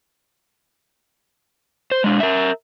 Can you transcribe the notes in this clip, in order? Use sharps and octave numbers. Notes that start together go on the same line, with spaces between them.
C5
G#3 D4
A#4 E5